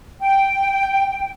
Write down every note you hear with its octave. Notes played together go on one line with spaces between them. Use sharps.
G5